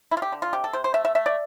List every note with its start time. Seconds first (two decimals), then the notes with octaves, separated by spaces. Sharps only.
0.11 D3 E4
0.17 F4
0.22 G4
0.32 D3
0.42 F4
0.53 C3 G4
0.64 A4
0.73 C3 C5
0.84 C5
0.94 A3 E5
1.05 E5
1.15 A3 E5
1.26 D5